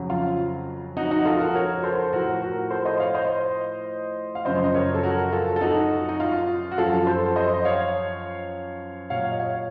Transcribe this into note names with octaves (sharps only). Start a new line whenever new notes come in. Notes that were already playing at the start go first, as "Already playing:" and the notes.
Already playing: F2 C#3 F#3
F4
D#4 F#4
D#4 F#4
F4 A4
F#4 A#4
A#4 C#5
A4 C5
A2 F3 F#4 A#4
F#4 A#4
A4 C5
C5 D#5
C#5 F5
C5 D#5
F5
F#2 C#3 F3 C5 D#5
D#5
A#4 C#5
A4
F#4 A#4
F4 A4
A4
D#4 F#4
D#4
F4
F#4
F#2 F3 F4 A4
A4 C5
C5 D#5
D#5
C#5 F5
A#2 F#3 C#5 F5
D#5
C#5 F5